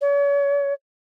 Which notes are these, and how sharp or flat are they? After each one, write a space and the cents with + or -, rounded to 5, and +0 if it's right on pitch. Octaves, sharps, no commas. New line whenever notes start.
C#5 +40